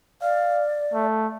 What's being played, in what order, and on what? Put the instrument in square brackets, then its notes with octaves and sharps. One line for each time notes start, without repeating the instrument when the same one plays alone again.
[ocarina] D5 [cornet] F5
[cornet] A3